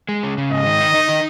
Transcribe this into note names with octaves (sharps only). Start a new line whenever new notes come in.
G#3
C#3
C#3
G#2 D#5
D#3
D#4
D#4
D#3